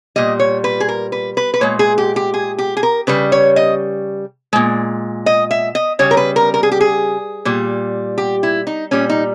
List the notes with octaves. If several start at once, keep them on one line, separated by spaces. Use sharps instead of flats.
A#2 G3 D#5
C#5
B4
G#4
A#4
B4
B4
B4
A#2 G#3 C#5
G#4
G4
G4
G#4
G4
G#4
A#4
C#3 G3 B4
C#5
D#5
A#2 G#3
D#5
E5
D#5
C#3 G3 C#5
A#4
B4
A#4
A#4
G#4
G4
G#4
A#2 G3
G4
E4
D#4
A#2 G3 C#4
D#4